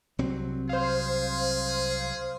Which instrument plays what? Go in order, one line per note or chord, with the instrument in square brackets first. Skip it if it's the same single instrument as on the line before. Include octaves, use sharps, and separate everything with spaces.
[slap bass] C2 F#3 C4
[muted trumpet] G#4 [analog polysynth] C5 F5